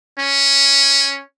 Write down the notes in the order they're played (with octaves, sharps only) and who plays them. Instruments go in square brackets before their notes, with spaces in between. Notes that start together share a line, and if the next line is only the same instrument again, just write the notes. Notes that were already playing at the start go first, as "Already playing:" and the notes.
[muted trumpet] C#4